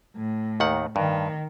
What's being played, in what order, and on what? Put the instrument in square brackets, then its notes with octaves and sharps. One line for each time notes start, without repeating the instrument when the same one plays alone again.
[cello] A2
[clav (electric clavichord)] D#2 D#3 F#5
[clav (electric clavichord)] G2 [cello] D#3